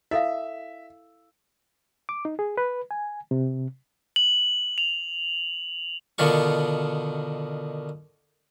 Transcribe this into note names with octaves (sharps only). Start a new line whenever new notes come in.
E4 A4 E5 F5
D6
D#4
G#4
B4
G#5
C3
F#7
F7
B2 D3 D#3 F4 C#6